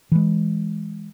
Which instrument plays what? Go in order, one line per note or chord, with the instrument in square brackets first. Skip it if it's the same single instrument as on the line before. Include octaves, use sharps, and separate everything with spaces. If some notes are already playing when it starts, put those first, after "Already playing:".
[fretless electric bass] E3 G#3